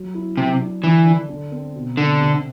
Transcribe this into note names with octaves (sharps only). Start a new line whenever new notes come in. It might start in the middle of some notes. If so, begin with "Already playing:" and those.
Already playing: F#3
E4
C3 F#3
D4
D3 E3
D4
D3
C4
B2
D3 C4
C3